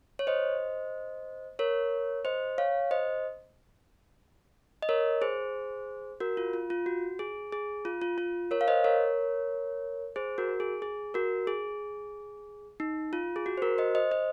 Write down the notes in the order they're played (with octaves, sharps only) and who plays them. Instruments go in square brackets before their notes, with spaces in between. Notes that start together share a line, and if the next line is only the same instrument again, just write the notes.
[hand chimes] C#5
C5 D#5
A#4 C#5
C5 D#5
C#5 F5
C5 D#5
D#5
A#4 C#5
G#4 C5
F#4 A#4
F4
F4
F4
F#4
G#4
G#4
F4
F4
F4
A#4 C#5
F5
C5 D#5
A#4 C#5
G#4 C5
F#4 A#4
G#4
G#4
F#4 A#4
G#4
D#4
F4
G#4
F#4
C5
F#4 A#4
C5 D#5
C5 D#5
C5 D#5